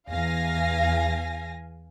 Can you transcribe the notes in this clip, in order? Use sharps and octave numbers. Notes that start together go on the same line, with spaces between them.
E2 F5 G#5 A#6